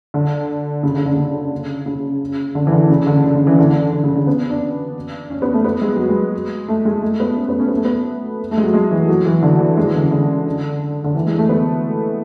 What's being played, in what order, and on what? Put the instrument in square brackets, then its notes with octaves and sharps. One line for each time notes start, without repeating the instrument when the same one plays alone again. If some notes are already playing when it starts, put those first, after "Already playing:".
[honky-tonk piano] D3
C#3
D3
D3
C#3
C#3
D3
E3
D3
C#3
D3
C#3
D3
E3
C#3
D3
D3
C#3
D3
B3
C#4
D4
C#4
B3
A3
B3
G#3
F#3
G#3
A3
G#3
A3
B3
C#4
B3
C#4
B3
A3
B3
A3
G#3
F#3
G#3
E3
F#3
E3
D3
E3
G#3
E3
D3
C#3
D3
D3
E3
G#3
A3
B3